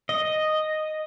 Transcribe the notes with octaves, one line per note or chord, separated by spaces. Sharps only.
D#5